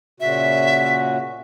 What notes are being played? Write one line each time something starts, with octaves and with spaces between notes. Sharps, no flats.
A#2 C#3 F#4 E5